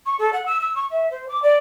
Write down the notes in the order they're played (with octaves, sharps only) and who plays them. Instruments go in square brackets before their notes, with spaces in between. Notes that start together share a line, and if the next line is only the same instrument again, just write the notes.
[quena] C#6
A4
F#5
E6
E6
C#6
E5
C5
D6
D5